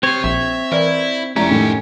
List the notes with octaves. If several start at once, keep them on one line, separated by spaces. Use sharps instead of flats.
C4 G4 C#5 C6
A#1 E5
E3 E4 A#4 D5
F1 F2 G3 A3 C#4 E4 G4 A#5
A2 D#3